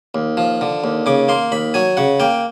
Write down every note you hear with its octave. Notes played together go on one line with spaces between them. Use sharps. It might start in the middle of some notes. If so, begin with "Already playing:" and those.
D#2
F3
D3
D#2
C#3 D6
A#3 C6
D#2 B5
F#3 G#5
C#3 F#5
A#3 G5